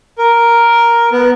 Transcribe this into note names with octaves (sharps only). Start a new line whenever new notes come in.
A#4
B3